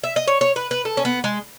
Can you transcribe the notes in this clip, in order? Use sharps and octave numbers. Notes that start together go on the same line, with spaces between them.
E5
D#5
C#5
C#5
B4
B4
A4
C#4
B3
G#3